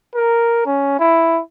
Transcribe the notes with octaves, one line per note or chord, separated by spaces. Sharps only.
A#4
C#4
E4